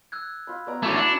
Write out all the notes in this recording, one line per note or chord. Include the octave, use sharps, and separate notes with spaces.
E6 F#6 G#6
F4 B5
B3 D5 A#5
A3 C#4 E4 F#4 G#5 A5 D6 G#6
D4 C#7 F#7